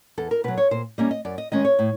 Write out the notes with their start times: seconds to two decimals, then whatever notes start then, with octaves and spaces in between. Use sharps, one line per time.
0.17 E2 A4
0.31 A#4
0.44 B2 F#3 B4
0.58 C#5
0.71 A#2 C5
0.98 G3 A#3 C#4 D#5
1.11 D#5
1.25 F#2 D5
1.38 D#5
1.52 D#3 G#3 C#4 D#5
1.65 C#5
1.79 A2